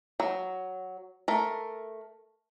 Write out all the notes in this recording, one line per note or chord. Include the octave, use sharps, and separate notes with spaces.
F#3
A3 A#4